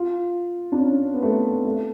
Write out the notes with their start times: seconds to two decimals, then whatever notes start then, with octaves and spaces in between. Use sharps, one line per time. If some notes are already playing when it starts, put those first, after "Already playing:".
Already playing: F4
0.72 D4
0.79 C#4
1.14 B3
1.23 A3
1.65 A3